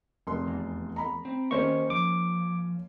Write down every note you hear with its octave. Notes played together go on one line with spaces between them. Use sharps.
F1 C6
E2
A#5 B5
C4
D#3 A#3 C#4 G4 C5 D#5 C#6
F3 D6